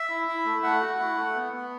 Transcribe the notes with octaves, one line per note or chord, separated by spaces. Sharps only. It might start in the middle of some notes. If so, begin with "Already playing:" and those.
Already playing: E5
E4
E4
A3
A3 F#5
F#4
E4
A3
B3
B3